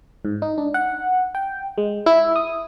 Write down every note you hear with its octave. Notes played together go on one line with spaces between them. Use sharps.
G#2
D#4
D4
F#5
G5
G#3
E4
D#6